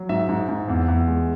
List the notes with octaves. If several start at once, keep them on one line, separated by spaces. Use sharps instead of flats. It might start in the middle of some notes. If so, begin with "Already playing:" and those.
Already playing: F#3
G#2 E5
G#2
G#2
E2
E2
G#3